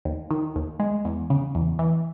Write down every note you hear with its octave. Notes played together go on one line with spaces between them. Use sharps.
D#2
D#3
D#2
G#3
E2
C#3
E2
E3